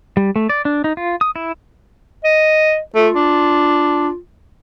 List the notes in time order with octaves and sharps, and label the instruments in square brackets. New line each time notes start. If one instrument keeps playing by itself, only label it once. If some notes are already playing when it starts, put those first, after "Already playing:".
[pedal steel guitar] G3
A3
D5
D4
D#4
F4
D#6
E4
[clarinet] D#5
[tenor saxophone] A3 [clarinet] F4
[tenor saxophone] D4